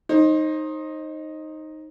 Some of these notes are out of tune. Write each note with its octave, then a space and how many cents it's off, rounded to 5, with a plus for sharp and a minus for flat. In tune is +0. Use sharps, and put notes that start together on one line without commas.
D#4 +0 C5 +30